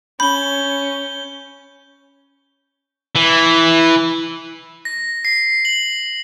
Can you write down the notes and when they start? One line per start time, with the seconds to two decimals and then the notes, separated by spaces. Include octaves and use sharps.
0.20 C#4 B5 G6 G7
3.16 E3
4.85 A#6
5.25 C7
5.65 F#7